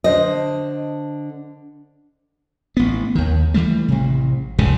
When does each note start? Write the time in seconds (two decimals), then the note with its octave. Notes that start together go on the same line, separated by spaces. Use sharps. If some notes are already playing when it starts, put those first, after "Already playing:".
0.04 D3 C5 D#5
2.77 A1 B3
3.15 D#2 D#3
3.54 E3 F3 G3 A3
3.88 A1 C3
4.59 F1 C#2 G#2 C#3